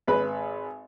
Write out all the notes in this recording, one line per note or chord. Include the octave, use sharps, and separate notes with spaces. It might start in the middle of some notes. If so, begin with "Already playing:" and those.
G#1 B4 B5